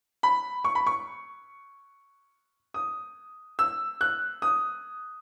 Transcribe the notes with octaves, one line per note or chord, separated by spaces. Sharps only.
B5
C#6
B5
C#6
D#6
E6
F#6
D#6